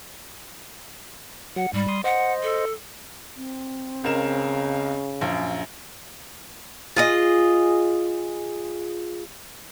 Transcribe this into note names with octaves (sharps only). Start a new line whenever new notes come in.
F#3 F#5
G#2 G3
C6 D#6
C5 D#5 F#5
A4
C4
C#2 C#3 A#4 E7
A#1 F#2 F5
F4 G#4 D#5